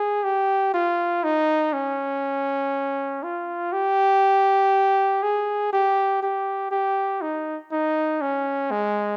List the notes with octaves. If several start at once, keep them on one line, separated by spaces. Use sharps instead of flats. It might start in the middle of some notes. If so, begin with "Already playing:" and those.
Already playing: G#4
G4
F4
D#4
C#4
F4
G4
G#4
G4
G4
G4
D#4
D#4
C#4
G#3